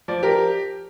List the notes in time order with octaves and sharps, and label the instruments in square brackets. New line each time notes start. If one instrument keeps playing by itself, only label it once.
[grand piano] F3 [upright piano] D5
[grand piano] G4 [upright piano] A#4